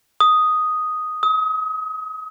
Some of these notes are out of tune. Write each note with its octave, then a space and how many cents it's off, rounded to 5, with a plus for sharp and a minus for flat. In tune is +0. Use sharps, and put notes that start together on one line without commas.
D#6 +0
D#6 +35